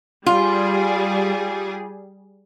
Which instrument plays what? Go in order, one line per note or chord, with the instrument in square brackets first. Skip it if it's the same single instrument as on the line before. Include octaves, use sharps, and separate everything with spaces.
[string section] G3 G#4 [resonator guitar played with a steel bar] F4